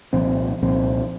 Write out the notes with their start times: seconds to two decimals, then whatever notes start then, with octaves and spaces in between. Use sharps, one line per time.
0.13 C2 A#2 F3 C4
0.62 C2 A#2 F3 C4